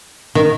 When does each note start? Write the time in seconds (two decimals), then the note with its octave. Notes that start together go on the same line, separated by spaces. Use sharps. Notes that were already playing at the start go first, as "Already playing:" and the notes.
0.35 D#3